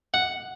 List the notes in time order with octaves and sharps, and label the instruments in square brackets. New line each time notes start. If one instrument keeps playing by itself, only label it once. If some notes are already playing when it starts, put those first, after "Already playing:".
[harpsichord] F#5